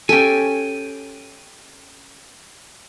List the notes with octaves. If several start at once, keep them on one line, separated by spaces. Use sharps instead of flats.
C#4 G4 A4 G5 G#5